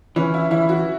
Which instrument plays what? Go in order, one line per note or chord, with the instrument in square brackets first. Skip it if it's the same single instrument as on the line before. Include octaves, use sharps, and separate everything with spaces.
[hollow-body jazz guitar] E3 [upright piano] C#4
[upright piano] E4
[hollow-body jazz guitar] E3 [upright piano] E4
[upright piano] F#4